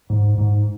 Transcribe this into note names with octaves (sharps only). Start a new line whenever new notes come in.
G#2
G#2